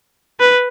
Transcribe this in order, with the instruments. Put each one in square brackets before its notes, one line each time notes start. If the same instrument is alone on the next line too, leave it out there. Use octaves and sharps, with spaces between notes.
[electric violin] B4